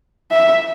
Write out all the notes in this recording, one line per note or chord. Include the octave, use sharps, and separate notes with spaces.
E5